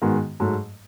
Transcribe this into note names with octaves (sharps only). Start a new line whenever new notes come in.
G#2 D#3 G#3 B3 F#4
G#2 F#3 A3